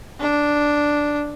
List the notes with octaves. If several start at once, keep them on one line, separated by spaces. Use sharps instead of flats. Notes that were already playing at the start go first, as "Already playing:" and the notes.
D4